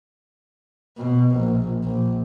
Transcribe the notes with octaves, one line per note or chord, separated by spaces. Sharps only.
B2
A#1
A#1